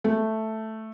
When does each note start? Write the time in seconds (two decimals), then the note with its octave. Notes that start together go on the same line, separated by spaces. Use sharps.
0.04 A3